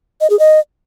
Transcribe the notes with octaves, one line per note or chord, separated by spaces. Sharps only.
D#5
G#4
D#5